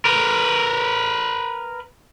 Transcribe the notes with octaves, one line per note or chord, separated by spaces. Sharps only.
A#4 B4